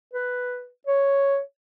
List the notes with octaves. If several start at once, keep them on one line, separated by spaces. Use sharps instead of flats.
B4
C#5